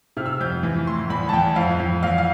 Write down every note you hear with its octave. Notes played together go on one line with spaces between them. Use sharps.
C3 F6
E6
F6
F2 G6
E3
A2 C6
E2 B5
A5
E2 G5
F2 F5
F2
E2 F5
F5